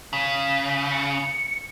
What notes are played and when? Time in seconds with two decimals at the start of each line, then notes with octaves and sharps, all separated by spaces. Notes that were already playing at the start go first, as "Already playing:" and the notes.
0.13 C#3 B6
0.91 C#7